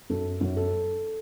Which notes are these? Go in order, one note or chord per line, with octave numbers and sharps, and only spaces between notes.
F#2 A4
F#2
A4